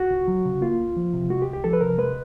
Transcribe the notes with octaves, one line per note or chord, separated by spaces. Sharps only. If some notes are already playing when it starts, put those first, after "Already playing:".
Already playing: F#4
C#2
F#3
C#3
A#3 F4
C#2
F3
C3
G#3 F#4
G4
C2
G4
F3 A4
B4
C3 A#4
G#3 B4